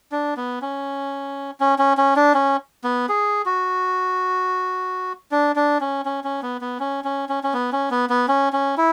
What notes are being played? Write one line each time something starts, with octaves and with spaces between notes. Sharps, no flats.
D4
B3
C#4
C#4
C#4
C#4
D4
C#4
B3
G#4
F#4
D4
D4
C#4
C#4
C#4
B3
B3
C#4
C#4
C#4
C#4
B3
C#4
B3
B3
C#4
C#4
E4